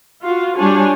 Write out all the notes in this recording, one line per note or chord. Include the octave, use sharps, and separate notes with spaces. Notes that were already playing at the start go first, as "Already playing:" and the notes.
F4 F#4
G3 D4 C#5 G#5